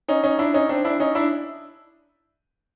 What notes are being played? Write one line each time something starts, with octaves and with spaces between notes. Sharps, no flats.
C#4 D#4
C#4 D#4
D4 E4
C#4 D#4
C4 D4
D4 E4
C#4 D#4
D4 E4